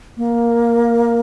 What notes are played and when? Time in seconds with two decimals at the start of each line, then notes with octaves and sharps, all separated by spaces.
0.17 A#3